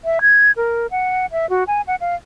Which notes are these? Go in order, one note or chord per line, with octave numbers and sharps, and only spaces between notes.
E5
G#6
A#4
F#5
E5
F#4
G#5
F#5
F5